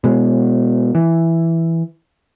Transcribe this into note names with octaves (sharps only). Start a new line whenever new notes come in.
B2 G#3
E3